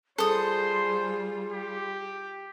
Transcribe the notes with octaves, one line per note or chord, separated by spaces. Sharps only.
G3 F4 G#4 A4 C5 D#6
G4